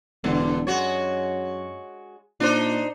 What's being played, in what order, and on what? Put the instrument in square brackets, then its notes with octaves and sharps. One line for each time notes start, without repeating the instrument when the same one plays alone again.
[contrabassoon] E1 [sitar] G2 D3
[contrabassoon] F#2 [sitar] G#3 F#4 C#5
[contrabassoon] A#2 [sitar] D4 D#4 C5